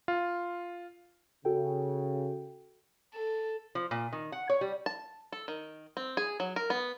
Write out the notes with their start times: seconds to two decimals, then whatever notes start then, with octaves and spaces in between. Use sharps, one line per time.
0.08 F4
1.45 C#3 F#4 A4 G5
3.14 A4
3.75 F3
3.91 A#2
4.13 D#3
4.32 F#5
4.50 C#5
4.61 G3
4.86 A5
5.32 A4
5.48 D#3
5.97 C4
6.17 G#4
6.40 F#3
6.56 A#4
6.70 B3